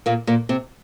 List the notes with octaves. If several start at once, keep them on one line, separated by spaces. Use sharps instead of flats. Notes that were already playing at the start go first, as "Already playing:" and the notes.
A#2 A#3
A#2 A#3
C3 C4